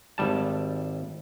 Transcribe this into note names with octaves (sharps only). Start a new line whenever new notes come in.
G#1 G3 A5